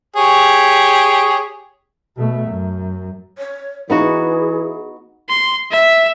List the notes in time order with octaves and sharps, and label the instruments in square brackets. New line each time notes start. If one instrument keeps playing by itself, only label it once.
[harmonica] G4 G#4 C#5
[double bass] B2 A3
F#2
[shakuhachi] C#5
[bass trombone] E3 [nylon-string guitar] B3 D#4 F#4 [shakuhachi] G#4
[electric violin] C6
E5